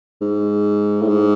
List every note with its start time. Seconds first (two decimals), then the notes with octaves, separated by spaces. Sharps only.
0.21 G#2
1.02 A2
1.08 G#2